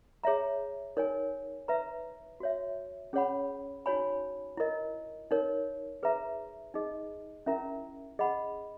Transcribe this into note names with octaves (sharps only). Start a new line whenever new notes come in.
G#4 C#5 E5 A#5
D#4 A#4 C#5 G#5
B4 E5 A#5
F#4 C#5 E5
C#4 G#4 C#5 F#5 B5
D#4 F#4 C#5 G#5 B5
E4 A#4 D#5
D#4 A#4 C#5
G#4 B4 E5 A#5
D#4 G#4 D#5
C#4 E4 A#4 E5 A#5
G#4 D#5 F#5 B5